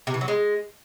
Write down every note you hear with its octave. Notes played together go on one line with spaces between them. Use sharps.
C3
E3
F#3
G#3